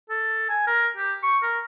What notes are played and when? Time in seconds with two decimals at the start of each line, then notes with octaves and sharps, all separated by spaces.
0.10 A4
0.49 G#5
0.67 A#4
0.97 G4
1.23 C#6
1.43 A#4